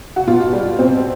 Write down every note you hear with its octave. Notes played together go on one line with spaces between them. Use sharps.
F#4
B2 F4
G3
B2 C4